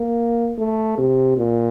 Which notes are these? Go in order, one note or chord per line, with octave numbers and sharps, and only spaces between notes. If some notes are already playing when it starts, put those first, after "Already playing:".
Already playing: A#3
A3
C3
A#2